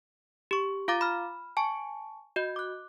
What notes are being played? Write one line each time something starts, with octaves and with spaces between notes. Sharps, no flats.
G4 C#6
F4 F5 A#5 D6 A6
B5 F6
G#5 A5 C#6
F#4 D#5 G6
D6 F#6